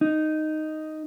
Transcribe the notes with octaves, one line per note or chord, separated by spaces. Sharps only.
D#4